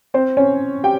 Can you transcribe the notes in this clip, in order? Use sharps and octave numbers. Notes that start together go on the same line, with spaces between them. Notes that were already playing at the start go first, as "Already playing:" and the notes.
C4 C5
C#4 C#5
G4 G5